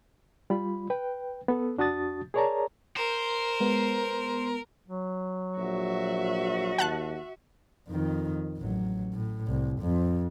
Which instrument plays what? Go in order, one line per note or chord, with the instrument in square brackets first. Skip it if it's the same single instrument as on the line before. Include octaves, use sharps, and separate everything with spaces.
[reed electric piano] G3 F4 B5
B4 G5
B3 A4
F2 D4 F#4 A5 D#6 A6
G#4 A#4 C#5 D5 A5 A#5
[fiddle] A#4 [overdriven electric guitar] C5
[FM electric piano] G#3 B3
[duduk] F#3
[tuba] A#1 [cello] F#4 E5
[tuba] D#2 [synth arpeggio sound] F#5 A5 F#6
[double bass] F2 D#3
A1 F#3
A2
C2
F2